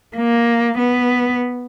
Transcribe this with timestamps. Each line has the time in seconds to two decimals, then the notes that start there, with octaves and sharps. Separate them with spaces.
0.17 A#3
0.78 B3